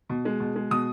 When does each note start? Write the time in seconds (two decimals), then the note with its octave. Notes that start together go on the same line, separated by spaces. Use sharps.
0.09 B2
0.25 G#3
0.40 B2
0.56 G#3
0.71 B2 D#6